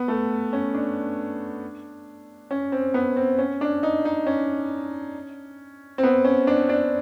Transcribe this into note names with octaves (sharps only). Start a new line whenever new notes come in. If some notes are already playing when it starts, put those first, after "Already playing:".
Already playing: B3
A3
C#4
D4
C#4
C4
B3
C4
C#4
D4
D#4
D#4
C#4
C4
B3
C#4
D4
D4